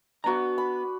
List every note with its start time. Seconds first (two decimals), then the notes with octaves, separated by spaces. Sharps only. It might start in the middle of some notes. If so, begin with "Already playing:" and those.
0.24 B3 D4 F#4 A#5
0.58 B5